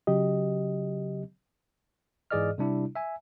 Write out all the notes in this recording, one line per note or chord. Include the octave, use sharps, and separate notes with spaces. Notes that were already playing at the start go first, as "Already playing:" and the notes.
C#3 F#3 G4 D#5
G#2 E3 G#4 D5 D#5 F6
C3 G3 D4 E4
E5 G#5